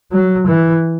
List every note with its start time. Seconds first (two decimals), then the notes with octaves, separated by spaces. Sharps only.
0.12 F#3
0.47 E3